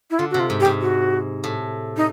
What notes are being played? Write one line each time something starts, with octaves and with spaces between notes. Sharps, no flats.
E4
D3 F4
C3 F#4
F4
G#2
G4
G#2
F#4
A2
D#4